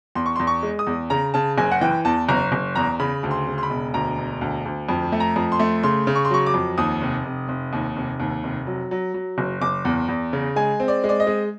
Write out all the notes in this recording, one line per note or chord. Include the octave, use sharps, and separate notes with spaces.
E2 C6
C#6
C6
E2
C#6
G#3
D#6
E2
C#3 A#5
C#3 A5
F#1 G#5
F#5
E3 G5
E2 A5
F#1 A#5
F#1
E2 A#5
C#3 B5
D2
C6
C#3
C6
B5
E1
D2 A#5
E1
D2
D2
F2
A3
A#5
F2
C6
A3
C#3 C6
C#3
C#6
C6
F#3 C#6
D6
F2
D#2 D#6
F1
F1
F1
D#2
F1
D#2
F1
F#3
F#3
F#3
F#1
F#1 D6
E2
E2
C#3
G#3 G#5
C4
D5
G#3
D5
D#5
G#3